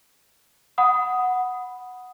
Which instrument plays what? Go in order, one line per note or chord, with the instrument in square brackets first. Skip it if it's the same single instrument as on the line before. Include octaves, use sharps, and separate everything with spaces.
[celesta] F#5 B5 D#6